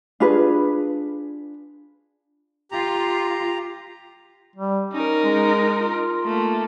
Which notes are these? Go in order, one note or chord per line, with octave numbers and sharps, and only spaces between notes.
D4 F4 G#4 B4
F4 G4 A#5
G3
C#4 D#4 A#4
G#3
F4
A3 A#3